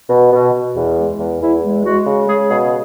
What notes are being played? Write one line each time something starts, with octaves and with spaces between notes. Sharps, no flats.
B2
B2
B2
E2
G#3
E2
E2 E4
G#3
G#3 F#4
C#3
G#3 G#4
B2 G#4